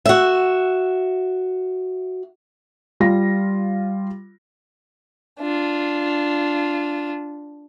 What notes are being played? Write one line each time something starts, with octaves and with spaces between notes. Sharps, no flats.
F#4 E5
G3 F4 A#6
D4 F4